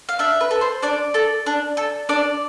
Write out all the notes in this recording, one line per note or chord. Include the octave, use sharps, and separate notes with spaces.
F5
D4 E5
B4
A4
C5
D4 D5
A4
D4
A4
D4 D5